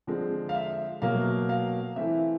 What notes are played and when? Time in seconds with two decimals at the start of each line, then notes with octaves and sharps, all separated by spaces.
0.07 D3 F3 G#3 C4
0.49 F5
0.55 E5
1.02 B2 F#3 A#3 F5
1.49 F5
1.96 E3 A3 C4 E5